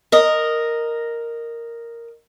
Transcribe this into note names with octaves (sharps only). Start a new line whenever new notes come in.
A#4 D#5